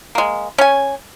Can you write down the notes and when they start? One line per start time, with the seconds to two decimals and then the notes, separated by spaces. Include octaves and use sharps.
0.15 G#3 A#3
0.58 C#4 G#5